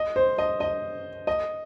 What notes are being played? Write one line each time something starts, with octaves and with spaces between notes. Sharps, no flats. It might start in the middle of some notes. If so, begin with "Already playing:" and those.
Already playing: D#5
C5
D#5
D#5
D#5